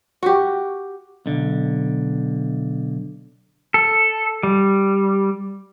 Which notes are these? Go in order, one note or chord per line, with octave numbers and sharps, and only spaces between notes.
F#4 G4
B1 D3
A4
G3